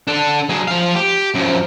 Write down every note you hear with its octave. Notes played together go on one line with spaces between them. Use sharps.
D4 A4
F#3 G#4
F3 F5
G4
F#2 F3